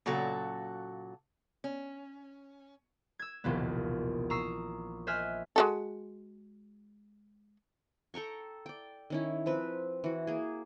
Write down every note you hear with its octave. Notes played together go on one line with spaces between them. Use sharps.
A#2 C#3 F#3 F#4 A4
C#4
E6 G#6
E1 A#1 D#2 C3 B3
A#5 C#6 D#6 E6 C7
C5 D#5 E5 G#5 F6 F#6
G#3 F#4 A4
A4 G5 A#5 C#6
D5 G5
D#3 C#4 E4
F3 C4 B4
E3 F#4
A#3 G#4